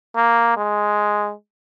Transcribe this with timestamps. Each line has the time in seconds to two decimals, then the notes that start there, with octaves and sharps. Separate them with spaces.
0.16 A#3
0.57 G#3